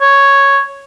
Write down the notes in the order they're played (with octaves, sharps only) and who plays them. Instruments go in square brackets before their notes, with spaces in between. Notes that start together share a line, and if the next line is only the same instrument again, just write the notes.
[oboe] C#5